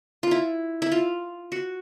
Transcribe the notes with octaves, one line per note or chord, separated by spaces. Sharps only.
F4
E4
E4
F4
F#4